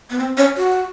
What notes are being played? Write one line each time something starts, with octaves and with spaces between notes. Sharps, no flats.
B3
C4
C#4
F#4